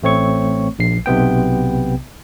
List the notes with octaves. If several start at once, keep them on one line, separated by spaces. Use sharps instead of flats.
A1 A3 C4 C#5 C#6
A#1 C7
B1 C3 B3 G5